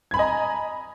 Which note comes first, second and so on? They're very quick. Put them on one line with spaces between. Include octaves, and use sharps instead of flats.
G#6 B5 G#5 D#5 A#5